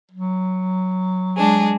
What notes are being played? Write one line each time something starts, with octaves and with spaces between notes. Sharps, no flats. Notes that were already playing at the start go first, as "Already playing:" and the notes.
F#3
G#3 D4 G#4